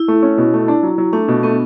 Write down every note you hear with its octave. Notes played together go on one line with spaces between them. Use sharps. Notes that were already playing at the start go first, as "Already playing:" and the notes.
Already playing: E4
A3
C#4
B2
A3
D4
F#3
F#3
A3 D4
B2
A3 B3